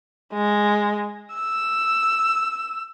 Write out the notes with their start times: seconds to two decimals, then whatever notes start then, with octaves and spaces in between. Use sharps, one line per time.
0.33 G#3
1.34 E6